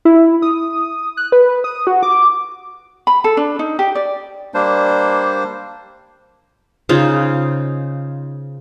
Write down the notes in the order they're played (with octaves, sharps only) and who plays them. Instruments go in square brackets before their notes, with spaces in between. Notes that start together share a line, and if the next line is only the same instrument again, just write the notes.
[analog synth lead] E4
D#6
F#6
B4
D#6
F#4
D6
[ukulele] B5
A4
D4
D#4
G4
D5
[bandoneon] G3 A#3 D4 C5
[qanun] C#3 D#4 F4 C5